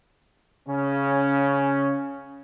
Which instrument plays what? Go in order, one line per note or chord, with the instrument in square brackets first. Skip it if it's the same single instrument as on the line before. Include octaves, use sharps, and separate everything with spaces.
[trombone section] C#3 C#4